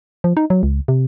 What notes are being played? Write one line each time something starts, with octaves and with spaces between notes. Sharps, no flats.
F3
D#4
F#3
C#2
C3